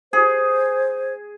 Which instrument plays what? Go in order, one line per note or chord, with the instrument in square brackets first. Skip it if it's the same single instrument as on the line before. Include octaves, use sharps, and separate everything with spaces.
[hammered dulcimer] G#4 [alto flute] C5